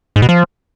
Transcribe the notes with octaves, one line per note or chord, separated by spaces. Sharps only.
G#2
B2
F3